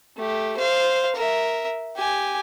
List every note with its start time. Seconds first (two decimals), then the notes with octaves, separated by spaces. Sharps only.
0.17 A3 G4
0.57 C5 F5
1.15 A#4 E5
1.96 G4 G#5